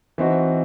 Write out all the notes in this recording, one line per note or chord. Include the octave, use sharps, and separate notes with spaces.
E3 C4 D#4 F#4